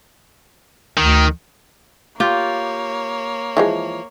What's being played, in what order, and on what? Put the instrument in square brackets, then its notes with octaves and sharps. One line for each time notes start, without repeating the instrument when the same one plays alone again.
[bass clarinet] D2 [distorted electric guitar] D#3
[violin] A#3 C#5 [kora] F4 G4
[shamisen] E3 F3 G#3